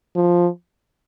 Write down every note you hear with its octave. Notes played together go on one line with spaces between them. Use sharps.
F3